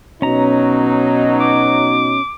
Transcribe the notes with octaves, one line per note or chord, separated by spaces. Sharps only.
B2 F#3 C#4 D#4 A#5
D6